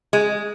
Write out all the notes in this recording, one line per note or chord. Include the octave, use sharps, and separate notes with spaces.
G#3